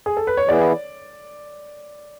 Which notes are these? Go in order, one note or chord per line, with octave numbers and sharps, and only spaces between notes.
G#4
A4
B4
C#5
E3 B3 E4 G#4 D5